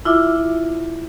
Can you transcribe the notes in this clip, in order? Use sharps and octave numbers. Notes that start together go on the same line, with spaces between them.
E4 F4 E5 D6